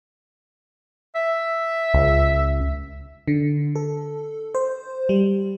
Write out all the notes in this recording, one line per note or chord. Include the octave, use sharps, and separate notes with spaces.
E5
C#2
D3
A4
C5
G3